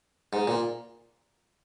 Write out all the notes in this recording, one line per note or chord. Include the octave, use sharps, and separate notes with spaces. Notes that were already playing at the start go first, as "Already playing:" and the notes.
G#2
A#2